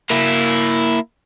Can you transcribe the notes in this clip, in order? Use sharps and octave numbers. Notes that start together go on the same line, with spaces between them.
A#3 E4